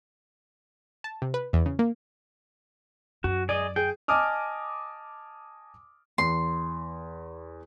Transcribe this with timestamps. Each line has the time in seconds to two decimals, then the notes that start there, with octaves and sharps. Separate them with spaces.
1.04 A5
1.22 C3
1.34 B4
1.53 E2
1.66 C#3
1.79 A#3
3.24 F#2 F#4
3.49 G#4 D5 D#5
3.76 G#4 G5
4.08 D#5 G#5 A5 D6 D#6 F6
6.18 E2 C6